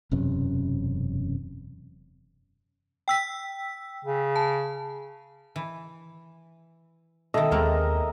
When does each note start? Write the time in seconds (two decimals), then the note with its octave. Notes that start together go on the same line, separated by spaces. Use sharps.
0.11 E1 F#2 C3 C#4
3.08 G5 E6 B6
4.05 C#3
4.36 A5
5.56 E3
7.34 B2 D#3 A4 D#5 E5
7.51 D#2 G#3 A#3 C4 A#4